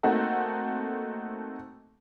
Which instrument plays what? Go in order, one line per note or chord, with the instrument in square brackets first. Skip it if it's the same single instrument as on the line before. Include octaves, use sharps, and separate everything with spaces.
[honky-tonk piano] A3 A#3 C4 D#4 F#4 A4